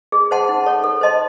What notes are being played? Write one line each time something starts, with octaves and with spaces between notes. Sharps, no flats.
G#4
C5 F#5 A5 C6
D#4
A4 C#5
A4
C5 D#5 A5 C6